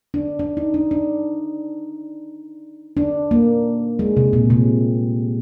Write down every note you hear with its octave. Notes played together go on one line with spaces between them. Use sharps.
D4
D4
D#4
D4
D4
D4
A#3
G#3
C3
A#2
C3